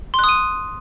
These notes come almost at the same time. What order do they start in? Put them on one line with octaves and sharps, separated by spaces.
C6 F#6 D#6 D#7